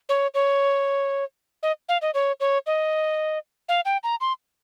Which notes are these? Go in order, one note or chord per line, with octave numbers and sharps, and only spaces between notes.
C#5
C#5
D#5
F5
D#5
C#5
C#5
D#5
F5
G5
A#5
C6